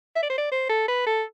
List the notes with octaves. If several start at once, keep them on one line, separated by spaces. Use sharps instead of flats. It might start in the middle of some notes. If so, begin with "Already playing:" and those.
E5
D5
C5
D5
C5
A4
B4
A4